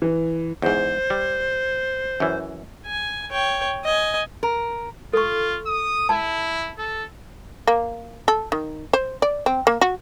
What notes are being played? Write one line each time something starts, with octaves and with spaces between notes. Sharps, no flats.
E3
E2 G#2 C5
G3
F#2 E3
G#5
C#5 G5
D#5 G#5
A#4
F4 A4 C#6
D#6
E4 A5
A4
A#3
A4
D#3
C5
D5
C4
A#3
F#4